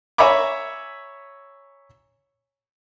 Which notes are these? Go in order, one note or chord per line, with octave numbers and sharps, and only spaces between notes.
C#5 E5 G#5 A#5 B5 D6